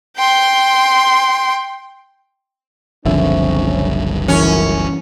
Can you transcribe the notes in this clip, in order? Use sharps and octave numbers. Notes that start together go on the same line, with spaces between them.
G5 C6
F#1 C2 D3 F3 C4 C#4 E5
G#1 F#2 A2 E3 C#4 E4